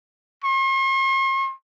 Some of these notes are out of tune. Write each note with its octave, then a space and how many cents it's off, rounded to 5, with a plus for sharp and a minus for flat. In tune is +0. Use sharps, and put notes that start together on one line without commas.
C6 +45